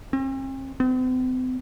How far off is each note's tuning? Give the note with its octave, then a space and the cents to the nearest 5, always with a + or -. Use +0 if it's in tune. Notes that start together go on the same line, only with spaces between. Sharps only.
C4 +45
C4 -45